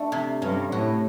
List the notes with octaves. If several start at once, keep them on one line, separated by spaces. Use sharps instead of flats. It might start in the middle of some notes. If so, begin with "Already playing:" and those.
Already playing: A3 D4
C3
G2 C#4
A2 F#4